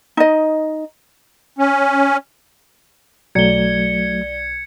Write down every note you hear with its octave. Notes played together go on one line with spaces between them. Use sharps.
D#4 D#5
C#4
B1 F#3 A3 D5 G#6 C#7 G7